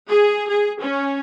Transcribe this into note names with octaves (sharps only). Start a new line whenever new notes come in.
G#4
G#4
C#4